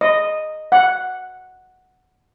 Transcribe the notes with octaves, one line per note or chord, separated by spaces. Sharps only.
D#5
F#5